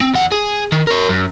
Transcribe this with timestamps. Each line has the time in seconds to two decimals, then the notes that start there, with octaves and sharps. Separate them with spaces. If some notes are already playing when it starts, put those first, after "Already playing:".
0.01 C4
0.14 E2 F#5
0.32 G#4
0.72 D#3
0.87 A#4 C#5
1.09 F#2